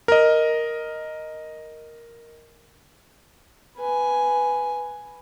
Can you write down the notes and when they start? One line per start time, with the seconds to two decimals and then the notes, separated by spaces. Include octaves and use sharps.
0.08 A#4 D#5
3.77 B4 G#5